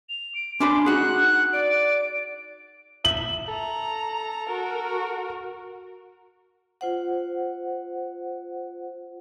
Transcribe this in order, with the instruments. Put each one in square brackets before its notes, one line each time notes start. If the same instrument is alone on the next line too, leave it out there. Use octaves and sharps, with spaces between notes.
[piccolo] F7
D7
[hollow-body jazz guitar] C#4 D4 B5 [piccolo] C6 [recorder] D6
[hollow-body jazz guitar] D#4 F#4 G#4 [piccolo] F#5 [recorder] F#6
[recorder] D5 [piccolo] D7
[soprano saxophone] E5 [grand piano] F#7
[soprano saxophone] A4 [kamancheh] A#5
[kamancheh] F#4 A#4
[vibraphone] F4 C5 F#5